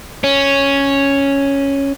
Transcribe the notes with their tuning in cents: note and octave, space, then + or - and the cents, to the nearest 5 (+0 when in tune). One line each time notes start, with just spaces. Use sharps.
C#4 +0 C#5 +0